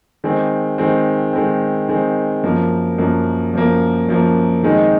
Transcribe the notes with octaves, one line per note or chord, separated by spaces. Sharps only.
D#3 G#3 C4
D#3 G#3 C4
D#3 G#3 C4
D#3 G#3 C4
F#2 F3 A#3
F#2 F3 A#3
F#2 F3 A#3
F#2 F3 A#3
D#3 G#3 C4 D#4